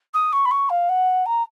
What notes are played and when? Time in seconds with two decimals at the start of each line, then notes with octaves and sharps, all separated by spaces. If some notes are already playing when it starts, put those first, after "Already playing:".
0.14 D#6
0.32 C#6
0.45 B5
0.51 C#6
0.69 F5
0.89 F#5
1.25 A#5